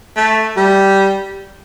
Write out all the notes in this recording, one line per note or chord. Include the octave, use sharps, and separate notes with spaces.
A3
G3